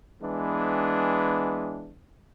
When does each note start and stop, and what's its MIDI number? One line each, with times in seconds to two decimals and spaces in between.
0.22 1.93 52
0.22 1.93 56
0.22 1.93 59
0.22 1.93 62